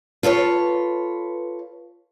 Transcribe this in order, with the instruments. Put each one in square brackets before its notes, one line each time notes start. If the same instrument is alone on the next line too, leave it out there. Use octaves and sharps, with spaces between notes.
[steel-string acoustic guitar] F4 A4 B4 C#5